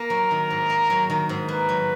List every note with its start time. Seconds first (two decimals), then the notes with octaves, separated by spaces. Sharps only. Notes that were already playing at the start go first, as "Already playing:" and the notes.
Already playing: A#3 A#4
0.10 F#3
0.31 D#3
0.50 G#2
0.70 A#3
0.90 F#3
1.10 D#3
1.29 G#2
1.48 A#3 B4
1.69 F#3